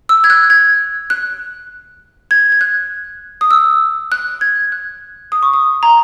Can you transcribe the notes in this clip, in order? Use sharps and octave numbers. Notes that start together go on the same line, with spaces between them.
E6
G#6
F#6
G#6
F#6
G#6
G#6
F#6
D#6
E6
F#6
G#6
F#6
D#6
C#6
D#6
A#5